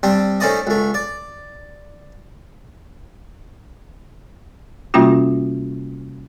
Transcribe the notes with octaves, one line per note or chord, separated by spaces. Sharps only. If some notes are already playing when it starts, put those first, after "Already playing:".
G3 C4 D4
A3 C#4 D#4 C5 D5 D#5
C#2 A3
D5
C3 G3 A#3 C#4 F4 F#4